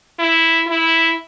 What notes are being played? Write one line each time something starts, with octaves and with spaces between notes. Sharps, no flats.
E4
E4